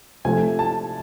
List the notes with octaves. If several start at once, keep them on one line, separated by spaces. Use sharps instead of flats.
C3 F3 A3 G#5
A5